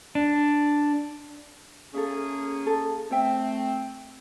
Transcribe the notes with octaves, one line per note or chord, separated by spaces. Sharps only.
D4
A#3 C#4 G#4 A4 E5
A4 A5
A3 C4 C5 E5 G5